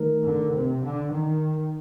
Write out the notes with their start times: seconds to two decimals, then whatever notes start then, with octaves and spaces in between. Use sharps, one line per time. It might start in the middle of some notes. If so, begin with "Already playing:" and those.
Already playing: D#3 A3 D#4 A#4
0.25 D3
0.54 C3
0.83 D3
1.12 D#3